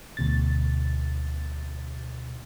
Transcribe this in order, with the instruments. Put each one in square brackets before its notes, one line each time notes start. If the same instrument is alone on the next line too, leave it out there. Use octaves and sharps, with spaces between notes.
[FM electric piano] D2 B2 A6